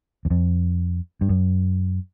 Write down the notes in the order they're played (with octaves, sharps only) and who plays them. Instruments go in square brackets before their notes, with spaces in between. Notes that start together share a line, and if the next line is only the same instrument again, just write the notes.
[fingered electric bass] E2
F2
G2
F#2